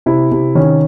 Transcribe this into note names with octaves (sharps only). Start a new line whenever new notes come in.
C3 E4
C3
D#3 C#4